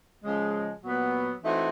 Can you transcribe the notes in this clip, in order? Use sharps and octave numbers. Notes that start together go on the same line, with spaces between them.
C#3 F3 G#3
A#2 F#3 B3
E3 A3 C4 D#4 F#4